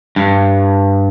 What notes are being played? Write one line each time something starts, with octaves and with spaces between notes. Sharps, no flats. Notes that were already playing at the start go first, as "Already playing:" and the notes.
G2